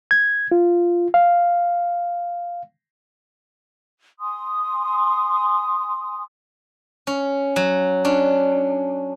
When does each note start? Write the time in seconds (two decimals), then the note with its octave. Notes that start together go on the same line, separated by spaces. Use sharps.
0.11 G#6
0.52 F4
1.14 F5
4.20 G#5 C6 D#6
7.07 C#4
7.56 F#3
8.05 C#4 D4